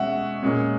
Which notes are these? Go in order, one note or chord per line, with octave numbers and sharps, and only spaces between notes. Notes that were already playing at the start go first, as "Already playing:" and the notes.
Already playing: B2 G#3 C#4 E5 F#5
A#2 G#3 C#4